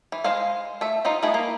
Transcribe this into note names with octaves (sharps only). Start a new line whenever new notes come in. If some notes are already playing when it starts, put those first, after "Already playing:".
E3
G#3 C5 D#5 F5
A3 E5
D#4 F4 C5 D#5
A3 B3 E4 G#4 D#5
A#3